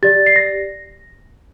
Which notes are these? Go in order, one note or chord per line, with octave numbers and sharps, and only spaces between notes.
G4 D5 A6
C7
A#6